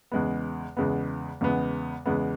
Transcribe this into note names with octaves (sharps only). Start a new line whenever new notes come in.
E2 C#3 G#3 B3
E2 C#3 G#3 B3
E2 C#3 G#3 B3
E2 C#3 G#3 B3